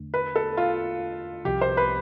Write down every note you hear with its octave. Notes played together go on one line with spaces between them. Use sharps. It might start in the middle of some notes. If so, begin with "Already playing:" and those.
Already playing: E2 D3 A3 D4
B4
A4
F4
C2 C3 F3 G4
C5
B4